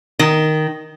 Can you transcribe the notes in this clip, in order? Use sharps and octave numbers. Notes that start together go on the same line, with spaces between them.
D#3